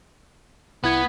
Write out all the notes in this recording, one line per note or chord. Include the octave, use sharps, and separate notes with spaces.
C2 B3 E4 G#6